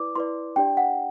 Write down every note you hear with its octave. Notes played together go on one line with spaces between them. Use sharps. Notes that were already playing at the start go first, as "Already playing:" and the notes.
Already playing: E4 B4 D5 D6
E4 B4 D5 C6
D4 G4 D5 G5
F#5